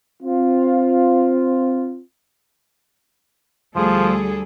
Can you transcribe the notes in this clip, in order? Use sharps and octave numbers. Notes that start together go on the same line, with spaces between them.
C4 F4
D2 F3 G3 G#4 A4